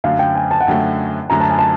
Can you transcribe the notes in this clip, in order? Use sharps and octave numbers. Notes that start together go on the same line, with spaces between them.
F#2 D3 F#3 A3 F5
G5
G#5
A5
F#5
F#2 D3 F#3 A3 G5
F#2 D3 F#3 A3 A#5
A5
G#5
A5